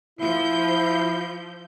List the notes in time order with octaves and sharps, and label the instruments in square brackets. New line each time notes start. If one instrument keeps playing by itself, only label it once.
[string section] F3 G6 [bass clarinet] E4